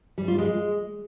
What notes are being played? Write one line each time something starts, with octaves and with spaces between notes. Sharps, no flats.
G3
F4
G#3